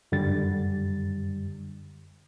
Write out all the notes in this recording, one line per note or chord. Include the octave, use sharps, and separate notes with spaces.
F#2 D3 G3 A6